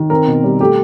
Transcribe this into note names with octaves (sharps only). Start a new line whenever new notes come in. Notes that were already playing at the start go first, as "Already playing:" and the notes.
Already playing: D#3
C4 A#4
B2
G3
A3 G4